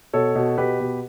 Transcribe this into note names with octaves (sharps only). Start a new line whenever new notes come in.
B2 A4 C#5
B2
B2 G4 B4
B2